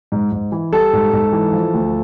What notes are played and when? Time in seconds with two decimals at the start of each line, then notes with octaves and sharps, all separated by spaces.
0.12 G#2
0.32 G#2
0.52 E3
0.72 G3 A4
0.93 G#2
1.13 G#2
1.32 E3
1.53 F3
1.74 D2